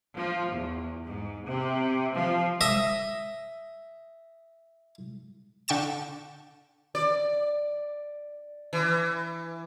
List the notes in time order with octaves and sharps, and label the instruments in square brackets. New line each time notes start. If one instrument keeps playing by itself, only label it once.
[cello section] F3
E2
G#2
C3
F3
[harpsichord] D#5 E5
[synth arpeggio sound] D3 G5 C#6 A6 E7
[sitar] D5
E3